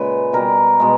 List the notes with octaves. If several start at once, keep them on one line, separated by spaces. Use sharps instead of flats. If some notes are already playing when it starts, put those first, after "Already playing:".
Already playing: A#2 C#3 G#3 B4
B2 G3 A#4
B2 G#3